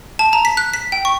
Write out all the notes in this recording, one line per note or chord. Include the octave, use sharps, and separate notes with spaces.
A5
A#5
B6
F#6
B6
G5
C#6